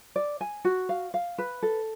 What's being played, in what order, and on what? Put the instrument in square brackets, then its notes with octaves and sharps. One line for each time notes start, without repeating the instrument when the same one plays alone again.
[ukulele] D5
G#5
F#4
F5
F5
B4
A4